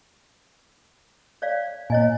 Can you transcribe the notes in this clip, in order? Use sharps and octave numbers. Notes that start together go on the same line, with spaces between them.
C#5 D5 F5
A#2 C#5 D#5 G#5